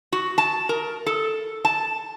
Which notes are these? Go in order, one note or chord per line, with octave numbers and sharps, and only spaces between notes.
F#4
A5
A#4
A4
A5